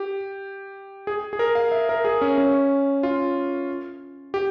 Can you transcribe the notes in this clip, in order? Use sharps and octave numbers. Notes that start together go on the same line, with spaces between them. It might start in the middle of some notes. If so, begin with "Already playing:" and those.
Already playing: G4
G#4
G#4
A#4
F5
E5
A#4
G#4
C#4
C#4
F4
G4